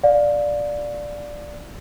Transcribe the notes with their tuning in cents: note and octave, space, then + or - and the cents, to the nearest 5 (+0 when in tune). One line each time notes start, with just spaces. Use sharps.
D5 +0 F5 +25